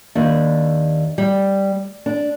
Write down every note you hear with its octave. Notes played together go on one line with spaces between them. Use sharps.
D#2 D4
G3
D4